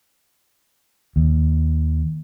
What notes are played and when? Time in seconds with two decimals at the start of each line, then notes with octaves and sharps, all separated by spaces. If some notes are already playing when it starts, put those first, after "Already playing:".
1.16 D#2